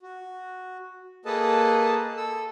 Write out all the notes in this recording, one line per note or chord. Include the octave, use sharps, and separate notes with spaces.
F#4
A#3 G#4 A4 B4 D#5 A5
A4 E6